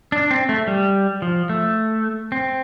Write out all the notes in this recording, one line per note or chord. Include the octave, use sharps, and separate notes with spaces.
D4
C4
A3
G3
F3
A3
C4